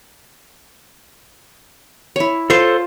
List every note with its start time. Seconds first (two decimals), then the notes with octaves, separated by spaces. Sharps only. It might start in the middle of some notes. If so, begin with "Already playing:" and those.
2.16 E4 C#5
2.50 F4 A4 C5 A5 C#6